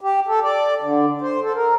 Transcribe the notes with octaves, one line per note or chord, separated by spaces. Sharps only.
G4
A4
D5
D3
C5
A4
A#4